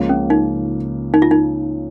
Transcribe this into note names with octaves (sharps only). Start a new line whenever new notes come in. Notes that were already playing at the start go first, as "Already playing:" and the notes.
Already playing: C#2 C#3 F3 A#3
C#4
D#4
D#4
F4
D#4